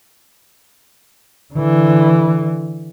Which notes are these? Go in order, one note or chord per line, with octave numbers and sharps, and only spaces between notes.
D3 E3